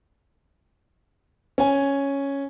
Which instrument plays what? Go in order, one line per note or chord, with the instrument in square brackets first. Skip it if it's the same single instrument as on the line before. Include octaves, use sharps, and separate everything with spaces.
[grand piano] C#4 G#5